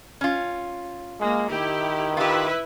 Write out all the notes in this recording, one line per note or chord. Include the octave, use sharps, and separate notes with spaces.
C#4 F4
G#3 A#3
D#3 E4 G4
E4 F4 G4 B4 E5